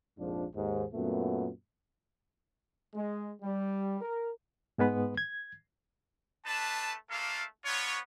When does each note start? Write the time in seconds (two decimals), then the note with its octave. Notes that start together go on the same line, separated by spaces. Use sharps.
0.18 A#1 F2 G#2 F3 D4
0.54 D#2 G#2
0.93 F#2 A#2 A3 B3
2.94 G#3
3.42 G3
4.01 A#4
4.78 G#2 G#3 B3 B4
5.17 G#6
6.45 A3 D4 B4 A5
7.09 A3 A#3 D4 F4 A4 F5
7.65 B3 D4 F4 C#5